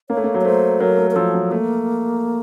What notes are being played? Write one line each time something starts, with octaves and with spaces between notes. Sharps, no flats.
A#3 C#5
A3
A#3
F#3
C#5
A3 C5
F#3 A#4
A3
A#4
F3 A4
F#3
A3 A#3